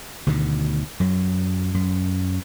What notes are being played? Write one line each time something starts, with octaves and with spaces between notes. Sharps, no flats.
D2 B2 D3 D#3
F#2 F#3
F#2